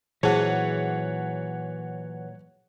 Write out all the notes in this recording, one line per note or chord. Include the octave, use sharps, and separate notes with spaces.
A#2 E3 F#3 G#4 C5 C#5 F#5 A5